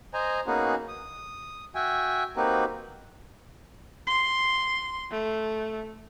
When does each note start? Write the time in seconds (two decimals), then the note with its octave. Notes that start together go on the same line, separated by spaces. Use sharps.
0.14 C5 D#5 G#5 A#5
0.47 A#3 B3 C#4 D#4 F#4 G#4
0.88 D#6
1.75 F#4 E5 G5 G#5
2.37 A#3 C4 D#4 F#4 G4 B4
4.07 C6
5.11 A3